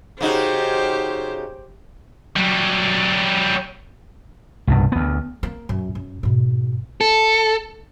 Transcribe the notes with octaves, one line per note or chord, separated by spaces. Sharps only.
C#3 D#4 F#4 G4 C5
F#3 G3
C2 G2 B2
D2 B3
A#3
F#2
F#2
G#2 B2
A4